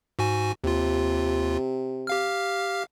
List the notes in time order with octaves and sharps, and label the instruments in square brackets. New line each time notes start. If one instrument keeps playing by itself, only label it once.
[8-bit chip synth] G#2 F#4 G#5
[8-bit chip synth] D#2 F4 [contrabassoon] C3
[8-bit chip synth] G4 F5 F6